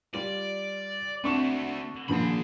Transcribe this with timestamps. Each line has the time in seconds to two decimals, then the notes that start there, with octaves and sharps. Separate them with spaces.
0.14 G3 F4 D5
1.24 A3 C4 D4 F#4 C#6 E7
2.09 A#2 D3 F3 G#4 B5